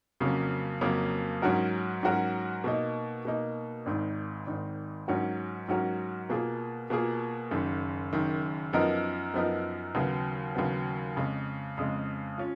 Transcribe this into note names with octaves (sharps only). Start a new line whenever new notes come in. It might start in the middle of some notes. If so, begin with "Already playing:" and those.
F2 C#3 F#3 A#3 C#4
F2 C#3 F#3 A#3 C#4
G#2 F#3 C#4 F#4 A#4
G#2 F#3 C#4 F#4 A#4
B2 A#3 D#4
B2 A#3 D#4
G#1 G#2 D#3
G#1 G#2 D#3
G#2 F#3 C#4 F#4 A#4
G#2 F#3 C#4 F#4 A#4
B2 A#3 F4 G#4
B2 A#3 F4 G#4
F#1 F#2 D#3
F#1 F#2 D#3
F#2 F3 B3 D#4 A#4
F#2 F3 B3 D#4 A#4
D#2 C#3 F#3 B3
D#2 C#3 F#3 B3
F2 C#3 G#3
F2 C#3 G#3
C#4 F4